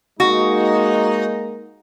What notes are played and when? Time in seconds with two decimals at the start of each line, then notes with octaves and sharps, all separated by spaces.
0.20 G#3 A#3 D#4 F#4